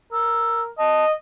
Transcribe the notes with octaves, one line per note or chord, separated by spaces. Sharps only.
A#4 E6
D#5 A5